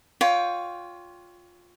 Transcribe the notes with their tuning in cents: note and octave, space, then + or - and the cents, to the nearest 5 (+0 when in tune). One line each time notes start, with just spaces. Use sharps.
F4 +15 C#5 +30 G5 +5